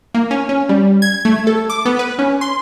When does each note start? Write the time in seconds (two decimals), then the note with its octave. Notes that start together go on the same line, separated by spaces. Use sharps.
0.14 A#3
0.31 C#4
0.49 C#4
0.69 G3
1.02 G#6
1.25 A3
1.47 A4
1.70 D6
1.85 B3
1.99 B4
2.19 C#4
2.41 C6